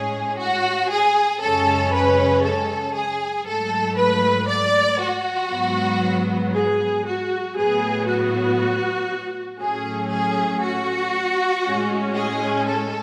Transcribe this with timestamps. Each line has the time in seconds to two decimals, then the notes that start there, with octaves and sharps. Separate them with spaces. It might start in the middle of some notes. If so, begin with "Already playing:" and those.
Already playing: A2 G#3 C#4 G#4
0.39 F#4
0.91 G#4
1.41 F#2 C#3 G#3 C#4 A4
1.93 B4
2.44 A4
2.95 G#4
3.46 G#2 F#3 A3 A4
3.97 B4
4.49 D5
5.00 F#4
5.51 G#2 F#3 B3
6.53 G#4
7.05 F#4
7.56 A2 F#3 B3 G#4
8.06 F#4
9.60 A2 F#3 A3 C#4 G#4
10.11 G#4
10.62 F#4
11.65 A2 G#3 C#4
12.16 G#4
12.67 A4